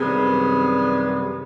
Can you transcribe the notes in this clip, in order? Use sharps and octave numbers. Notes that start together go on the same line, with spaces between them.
F#2 C3 D#3 G3 B3 G#4